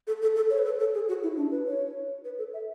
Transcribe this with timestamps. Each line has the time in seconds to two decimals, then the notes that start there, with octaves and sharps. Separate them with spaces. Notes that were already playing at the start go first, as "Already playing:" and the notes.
0.07 A4
0.22 A4
0.36 A4
0.50 C#5
0.58 B4
0.65 A4
0.80 A4
0.94 G#4
1.09 F#4
1.23 E4
1.37 D4
1.51 B4
1.67 C#5
2.25 B4
2.38 A4
2.54 E5